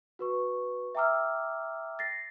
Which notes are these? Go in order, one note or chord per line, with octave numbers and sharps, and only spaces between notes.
F#4 B4 C#6
E5 G5 A#5 D6 E6 F6
A6 A#6 C7